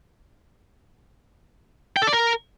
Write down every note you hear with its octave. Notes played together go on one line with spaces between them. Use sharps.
G5
A4
D5
A#4